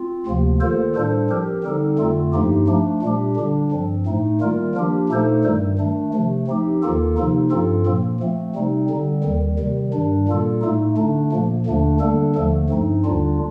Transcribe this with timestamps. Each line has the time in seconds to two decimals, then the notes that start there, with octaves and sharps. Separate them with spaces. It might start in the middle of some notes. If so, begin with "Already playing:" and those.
Already playing: C4 F4
0.26 D2 C3 F3 A#3
0.61 D#3 A#3 F4 A4 C5
0.95 A2 G3 D4 A4 C5
1.30 F3 C4 G4 A#4
1.64 D3 G3 C4 D#4 A4
1.98 F2 D3 A3 C4 F4
2.33 G2 F3 A#3 D#4 G4
2.68 F3 A3 D4
3.02 A#2 G3 D4 G4
3.37 D3 G3 D4
3.71 G2 F3 C4
4.06 A2 A3 D#4
4.41 D#3 G3 A#3 F4 A#4
4.75 F3 A#3 D4 G4
5.09 A#2 A3 D#4 A4 C5
5.44 G2 D#3 G3
5.78 D#3 A3 D4
6.13 C3 F3 A3
6.48 F3 C4 D#4 G4
6.83 D#2 D#3 A#3 F4 A4
7.17 C3 F3 A#3 D#4
7.51 G2 F3 C4 F4 A4
7.86 A#2 F3 A#3
8.20 F3 A3 C4
8.55 C3 G3 C4 D#4
8.90 D3 G3 C4
9.24 D#2 D#3 G3
9.59 C3 D#3 G3
9.93 G2 D#3 G3 D4
10.28 A#2 G3 A#3 F4 A4
10.62 A2 A3 D#4
10.97 D3 A3 D4
11.32 A#2 F3 A#3
11.66 D#2 D3 A3 D4
12.00 D3 G3 A#3 D4 A4
12.35 D#2 D3 F3 A3
12.69 G2 F3 C4 D#4
13.04 D#2 D3 G3 D4 F4